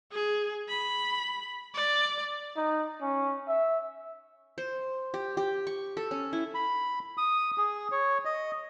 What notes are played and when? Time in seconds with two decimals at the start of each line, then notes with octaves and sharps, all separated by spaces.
0.12 G#4
0.69 B5
1.74 D5
2.57 D#4
3.02 C#4
3.48 E5
4.58 C5
5.14 G4
5.37 G4
5.67 C#6
5.97 A4
6.11 C#4
6.33 E4
6.55 B5
7.18 D#6
7.58 G#4
7.92 C#5
8.25 D#5